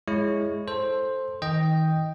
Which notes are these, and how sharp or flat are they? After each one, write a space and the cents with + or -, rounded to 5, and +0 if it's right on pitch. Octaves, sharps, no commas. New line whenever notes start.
G#3 +0 E4 +0 C#5 +0
A4 +0 C5 +10
D#3 +35 D#5 +0 G5 +0